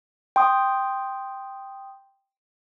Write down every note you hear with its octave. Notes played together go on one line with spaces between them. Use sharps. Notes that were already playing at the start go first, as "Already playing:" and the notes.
G5 C6 D#6